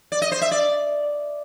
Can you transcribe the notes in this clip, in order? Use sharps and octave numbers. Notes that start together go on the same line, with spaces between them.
D5
D#5
C5
E5
D5